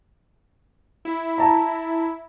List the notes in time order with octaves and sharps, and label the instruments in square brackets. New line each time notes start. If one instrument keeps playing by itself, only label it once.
[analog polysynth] E4
[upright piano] A5 A#5